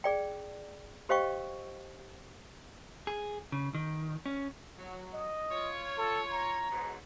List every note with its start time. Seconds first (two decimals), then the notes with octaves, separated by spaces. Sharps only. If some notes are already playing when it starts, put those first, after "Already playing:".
0.04 G#4 D5 G5
1.09 G4 C5 D#5 F5 G5 C#6
3.07 G#4
3.52 C#3
3.75 D#3
4.26 C#4
4.78 F#3
5.13 D#5
5.51 F4 C#5
5.98 A4
6.30 A#5
6.71 G#2 B2 F#3